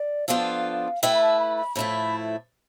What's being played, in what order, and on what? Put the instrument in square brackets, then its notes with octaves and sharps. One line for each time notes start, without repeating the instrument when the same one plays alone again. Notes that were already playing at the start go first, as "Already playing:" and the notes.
Already playing: [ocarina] D5
[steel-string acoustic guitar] F3 B3 D4 F4 A4 [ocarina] F5
[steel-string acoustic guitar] A3 E4 B4 E5 [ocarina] G5
[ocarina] B5
A5
B5
B5
[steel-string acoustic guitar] A2 F3 A3 E4 [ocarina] B5